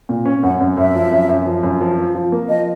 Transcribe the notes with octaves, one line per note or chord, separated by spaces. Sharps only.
A#2
C#4
F#2 F#5
F#2
F#2 E5
F3
F#2
F#2
F3
F#2
F3
F3
F3
A#3
F3 D#5